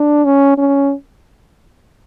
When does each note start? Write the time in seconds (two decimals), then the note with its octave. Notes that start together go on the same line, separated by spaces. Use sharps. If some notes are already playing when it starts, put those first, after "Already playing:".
Already playing: D4
0.25 C#4
0.58 C#4